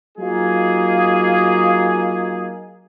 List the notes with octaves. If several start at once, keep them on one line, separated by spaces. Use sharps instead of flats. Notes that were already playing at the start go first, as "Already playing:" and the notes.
F#3 A#3 D#4 F4 G#4